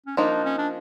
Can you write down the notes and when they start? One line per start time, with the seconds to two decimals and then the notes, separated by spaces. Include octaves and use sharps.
0.06 C#4
0.17 F3 A#3 D4 D#4
0.31 D4
0.45 C#4
0.58 D4